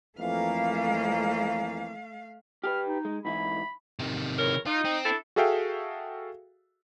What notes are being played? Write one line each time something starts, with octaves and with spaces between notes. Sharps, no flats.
F2 E3 A3 A#3 F5
G4 G#4 B4 F6
D#4
G#3
G#2 E3 E4 B5
C3 D#3
E2 A#4 C#5
D#4 F4
C4
D4 E4 A4
F#4 G#4 A4 E5 F5 G5